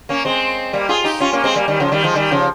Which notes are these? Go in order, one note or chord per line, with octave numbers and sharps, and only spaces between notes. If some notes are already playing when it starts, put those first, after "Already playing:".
A#3 C#4
G#3 C4
G3 A#3
F4 G#4
D#4 G4
C#4 F4
A#3 C#4
G#3 C4
G3 A#3
D#3 G3
C#3 F3
D#3 G3
F3 G#3
D#3 G3
C#3 F3